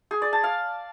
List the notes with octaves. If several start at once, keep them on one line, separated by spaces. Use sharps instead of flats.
G#4
D5
A5
F5